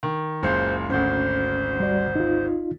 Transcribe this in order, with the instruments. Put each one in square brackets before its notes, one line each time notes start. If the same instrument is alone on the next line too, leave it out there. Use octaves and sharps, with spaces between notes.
[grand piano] D#3
[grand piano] F#1 C#2 [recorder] C5
[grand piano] G#1 D2 [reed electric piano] C#4 [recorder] C5
[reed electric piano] G3 F#4 D5
D#4 F4